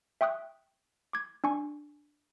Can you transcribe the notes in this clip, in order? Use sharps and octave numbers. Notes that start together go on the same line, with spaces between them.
E5 G5 C#6 D#6 F#6
D6 G#6
D4 G#5 C#6